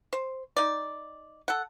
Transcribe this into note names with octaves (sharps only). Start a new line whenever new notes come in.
C5
D#4 D5
A4 F#5